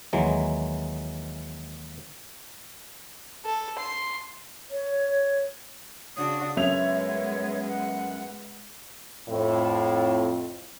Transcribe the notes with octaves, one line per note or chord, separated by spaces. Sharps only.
D#2 E3 F#3 G#3
A4
C6
C#5
C#3 D4 F#4 D#6
F#2 G#3 B3 C#5 E5 F7
F#5
F2 A2